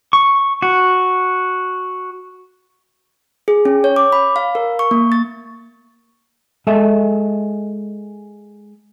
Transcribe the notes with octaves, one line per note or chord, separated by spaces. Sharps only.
C#6
F#4
G#4
C#4
C#5
D6
B5
F5
A#4
C#6
A#3
A6
G#3 A4 D#5 E5